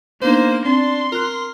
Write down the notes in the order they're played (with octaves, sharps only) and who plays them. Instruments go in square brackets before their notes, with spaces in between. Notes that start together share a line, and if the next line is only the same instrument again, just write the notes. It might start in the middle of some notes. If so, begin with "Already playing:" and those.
[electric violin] A#3 [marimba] B3 D4 D#4 [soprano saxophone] C5
[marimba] C4 [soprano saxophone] D4 [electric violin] C6
[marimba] F4 F#6 [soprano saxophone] A#4